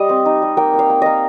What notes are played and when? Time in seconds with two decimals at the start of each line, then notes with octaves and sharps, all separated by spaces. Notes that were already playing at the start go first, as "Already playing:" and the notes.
Already playing: G3 D#5
0.09 C4
0.25 D#4
0.42 G3
0.57 A#3 G5
0.73 A#3
0.79 F5
0.90 A#3
1.02 A#3 D#5